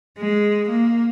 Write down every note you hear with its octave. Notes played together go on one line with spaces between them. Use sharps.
G#3
A#3